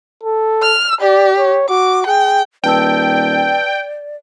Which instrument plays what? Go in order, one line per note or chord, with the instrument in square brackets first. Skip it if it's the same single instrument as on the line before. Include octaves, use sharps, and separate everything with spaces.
[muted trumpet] A4
[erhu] F6
[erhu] G4 [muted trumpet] D5
[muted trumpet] C#5
[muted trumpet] F#4 [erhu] D6
[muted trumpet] G#4 [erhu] G5
[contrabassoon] D#1 [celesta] B4 A5 E6 [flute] D5 [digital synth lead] G5